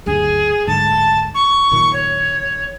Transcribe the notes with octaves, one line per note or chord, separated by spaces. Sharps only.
F#1 D2 G2 G#4
D1 G#2 D3 A5
C#6
F#1 A#2 D#3
C#5